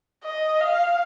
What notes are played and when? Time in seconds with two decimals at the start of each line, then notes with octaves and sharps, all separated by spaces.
0.23 D#5
0.60 F5